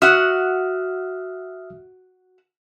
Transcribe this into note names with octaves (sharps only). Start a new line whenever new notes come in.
F#4 E5 F#5 D#6 F6